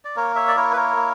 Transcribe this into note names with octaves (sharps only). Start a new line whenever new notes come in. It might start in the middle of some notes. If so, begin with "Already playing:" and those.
D5
A#3 A#4 C#5
C#5 E5
D5
E4 A#4 C#5
B4
A#4 C#5
A#3